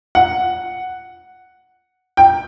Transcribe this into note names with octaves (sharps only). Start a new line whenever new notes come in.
F#5
G5